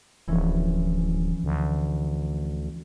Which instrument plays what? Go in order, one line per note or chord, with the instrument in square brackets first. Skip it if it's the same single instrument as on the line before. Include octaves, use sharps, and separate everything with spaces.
[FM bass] D1 [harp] E3 F3 C#4
[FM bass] D2